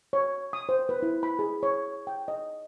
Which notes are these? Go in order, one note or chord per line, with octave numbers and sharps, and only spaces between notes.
C#5
D#6
C5
B4
E4
B5
G#4
C#5
G5
D#5